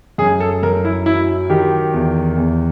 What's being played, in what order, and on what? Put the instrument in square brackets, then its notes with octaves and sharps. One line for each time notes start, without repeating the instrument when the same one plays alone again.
[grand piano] F#2 G#4
A4
F#2 A#4
E4
F#3 E4
D#3 G4
E2
E2